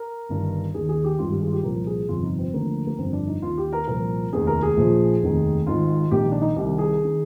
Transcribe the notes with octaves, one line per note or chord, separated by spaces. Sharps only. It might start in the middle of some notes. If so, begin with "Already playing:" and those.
Already playing: A#4
G1 G2 D#3
D#2 D#3 G#4
G#4
G4
G#1 G2 D#3 F4
G4
G#4
F4
G4
C2 A#2 F3 A#4
G#4
G1 F2 C3 F3 F4
D#4
C4
D2 D3 F3 A#3
A#3
G1 F2 D3 C4
D4
D#4
D#2 D#3 F4
G4
A#4
C2 A#2 F3 A#4
F1 D#2 D#3 G#4
A#4
G#4
A#1 A#2 F3
F1 D#2 D#3
G#1 G#2 D#3 F4
A#1 G#2 D#3 G4
D4
D#4
C2 C3 D#3 G4
G#4
D#3